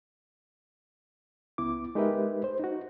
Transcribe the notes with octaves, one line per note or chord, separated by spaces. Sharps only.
C#2 B3 E4 D6
G#3 D#4 G4 A#4 B4 E5
C5
D#4 F#4